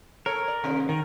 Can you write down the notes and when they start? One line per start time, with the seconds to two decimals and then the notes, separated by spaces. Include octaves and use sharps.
0.26 A4 A#4 C#5
0.48 D5
0.64 D#2 G#2 C3
0.89 D#3 A#4